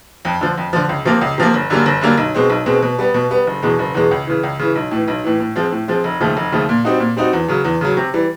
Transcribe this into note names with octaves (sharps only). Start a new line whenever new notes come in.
F2
D3 F3
F2
D3 F3
C#2
C3 F3 A#3
C#2
C3 F3 A#3
G1
F#2 D3 G3 A#3
G1
F#2 D3 G3 A#3
B1
B2 G#3 C4
B1
B2 G#3 C4
B2
G3 B3
B2
G3 B3
F#1
E2 B2 G#3
F#1
E2 B2 G#3
C#2
C#3 E3
C#2
C#3 E3
B1
A2 E3
B1
A2 E3
A2
F3 G#3 C4
A2
F3 G#3 C4
F1
D#2 C#3 F3 A3
F1
D#2 C#3 F3 A3
A#2
G3 C4 D#4 F#4
A#2
G3 C4 D#4 F#4
E2
C#3 F#3
E2
C#3 F#3
C3
E3 G3